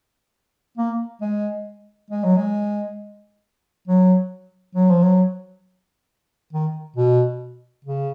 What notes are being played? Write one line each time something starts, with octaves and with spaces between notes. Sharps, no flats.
A#3
G#3
G#3
F#3
G#3
F#3
F#3
F3
F#3
D#3
B2
C#3